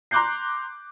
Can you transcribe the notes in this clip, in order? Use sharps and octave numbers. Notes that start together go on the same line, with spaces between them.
A#5 C6 D6 F#6 G6 C7